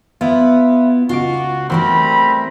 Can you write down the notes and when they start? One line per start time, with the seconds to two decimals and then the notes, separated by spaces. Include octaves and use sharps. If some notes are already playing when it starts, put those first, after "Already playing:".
0.21 B3 E4 F4
1.09 C#2 F4 F#4 D6
1.70 E3 G3 A3 C4 E4 A#4 A#5 B5